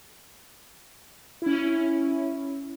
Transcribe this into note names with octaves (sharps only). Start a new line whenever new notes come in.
C#4 E4